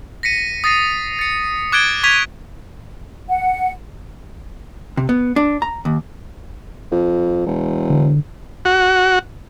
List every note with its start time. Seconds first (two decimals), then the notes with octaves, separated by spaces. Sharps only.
0.23 A#6 B6 C#7 D#7
0.64 D#6 A6 A#6 C7 D#7
1.19 A6 C#7
1.72 D6 F#6 G#6 A6 D7 G7
2.04 C#6 D6 G#6 B6 D#7 F7
3.29 F#5
4.97 C3
5.09 B3
5.36 D4
5.62 A#5
5.85 D#2
6.91 F2
7.47 E1
7.90 D3
8.65 F#4